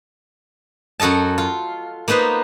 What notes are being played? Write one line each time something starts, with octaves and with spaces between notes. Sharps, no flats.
F#2 F#4 A4 D#5 A5
F4
A#3 B3 D#4 B4 C5